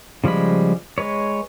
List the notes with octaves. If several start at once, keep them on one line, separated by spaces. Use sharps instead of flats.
C#3 F3 G3 G#3 B5
G#3 B4 C#5